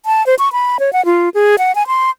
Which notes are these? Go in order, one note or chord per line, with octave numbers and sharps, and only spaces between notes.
A5
C5
C#6
B5
C#5
F#5
F4
G#4
F#5
G#5
C6